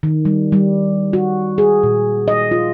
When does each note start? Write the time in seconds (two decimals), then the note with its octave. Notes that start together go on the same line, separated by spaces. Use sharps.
0.03 D#3
0.25 G3
0.52 G3
1.13 F#4
1.58 G#4
1.83 A#2
2.28 D#5
2.51 F4